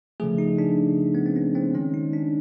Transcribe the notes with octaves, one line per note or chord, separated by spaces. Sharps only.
C#3 F3 A3 G#4
D#4
D4
B3
C4
C#4
C4
D#3 G#3 C#4
D#4
D4